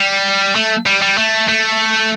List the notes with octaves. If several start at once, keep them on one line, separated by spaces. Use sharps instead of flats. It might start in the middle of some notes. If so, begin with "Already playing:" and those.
Already playing: G3
A3
G3
G3
A3
A3